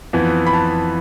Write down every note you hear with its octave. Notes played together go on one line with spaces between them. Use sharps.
F2 E3 B3
B5
A5